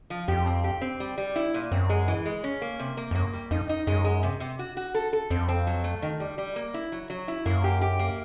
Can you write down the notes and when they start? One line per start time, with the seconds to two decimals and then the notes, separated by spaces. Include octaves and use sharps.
0.10 F3
0.28 F2 G4
0.46 C4
0.64 G4
0.81 C4
1.00 G3
1.18 G3
1.36 E4
1.54 A#2
1.72 F#2 C4
1.90 G#3
2.08 E3
2.25 G#3
2.44 C#4
2.62 A#3
2.79 C3
2.97 A#3
3.11 F2
3.15 F#2 A#3
3.34 G3
3.51 F2 D#4
3.69 D#4
3.87 F#2 G#3
4.05 G#3
4.23 C3
4.40 C3
4.59 F#4
4.77 F#4
4.95 A4
5.13 A4
5.30 F2 C4
5.49 C4
5.67 F#3
5.84 A3
6.02 D#3
6.20 G3
6.38 G3
6.56 A#3
6.74 E4
6.92 F#3
7.10 F#3
7.28 E4
7.46 F#2 A#3
7.64 G4
7.81 G4
7.99 A#3